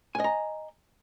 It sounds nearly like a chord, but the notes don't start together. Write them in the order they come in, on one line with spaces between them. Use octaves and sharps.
G#5 D#5 A#5